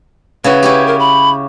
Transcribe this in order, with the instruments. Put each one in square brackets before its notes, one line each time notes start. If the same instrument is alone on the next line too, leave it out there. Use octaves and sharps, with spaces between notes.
[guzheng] C#3 E4 F#4 [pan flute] B4
[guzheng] C#4 E4 G4
[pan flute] A#4
B5